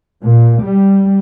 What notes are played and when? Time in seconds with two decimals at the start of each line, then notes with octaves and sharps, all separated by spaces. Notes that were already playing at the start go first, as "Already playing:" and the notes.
0.22 A#2
0.62 G3